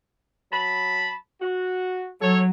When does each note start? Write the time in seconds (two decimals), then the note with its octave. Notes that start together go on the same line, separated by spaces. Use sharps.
0.52 F#3 A5 B5
1.41 F#4
2.21 F#3 A4 C#5